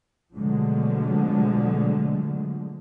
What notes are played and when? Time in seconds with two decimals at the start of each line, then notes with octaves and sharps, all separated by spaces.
0.36 B2 D3 F3 F#3 G#3 A3